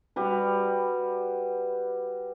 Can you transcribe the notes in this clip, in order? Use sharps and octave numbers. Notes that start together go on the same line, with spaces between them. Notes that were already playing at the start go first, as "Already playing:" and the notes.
G3 F#4 B4